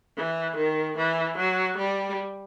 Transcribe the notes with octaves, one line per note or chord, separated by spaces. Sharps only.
E3
D#3
E3
F#3
G3